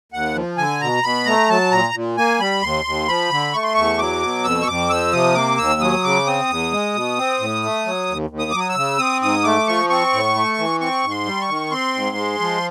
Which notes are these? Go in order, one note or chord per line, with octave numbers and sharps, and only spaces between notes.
D#2 F#5
F3
D3 G#5
B2 A#5
B2 B5
A3 A#5
F#3 A5
A#2 A#5
A#2
A#3 G#5
G3 B5
D#2 C6
D#2
F3 B5
D3
A3 C#6
C6
E2 C#6
F#3 D6
B2
F2 E6
C#6
F2 D6
F3 E6
C3 D#6
A#3 D6
D#2 E6
F#3 D#6
C#3 D6
C4 D#6
E2
G#3
B2
C4
A2
A3
F#3
D#2
D#2
D#6
F#3 D6
D#6
E6
C#3
C4 D#6
G#2 D#6
A3 D6
F3 C#6
C4 C#6
A2
A3
E3
C4 C#6
G#2
C6
G3
C#6
D#3
C4 C6
G#2
G#3
F3